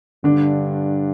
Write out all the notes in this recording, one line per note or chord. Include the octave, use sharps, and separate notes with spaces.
G2 D3 D4